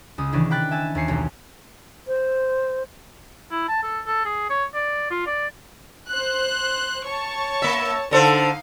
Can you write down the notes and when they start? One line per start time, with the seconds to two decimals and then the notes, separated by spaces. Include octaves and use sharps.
0.18 C#2 D#6
0.33 C3 D#3 E3 A#3 C#4 D4
0.51 G5 B5 F#6 A6 B6
0.71 E5 G#5 A5
0.95 D#2 G#5 C7 C#7
1.08 D#1 B1
2.07 C5
3.51 E4
3.68 A5
3.83 A4
4.06 A4
4.25 G#4
4.50 C#5
4.75 D5
5.11 F4
5.27 D5
6.09 C5 F#6
7.06 C#5 A5 C#6
7.62 A#3 E5
8.11 D3 D#4 A4 C5 F5